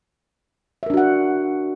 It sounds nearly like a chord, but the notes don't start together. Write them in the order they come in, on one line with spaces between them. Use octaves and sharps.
E5 A#4 D4 F#4 F#5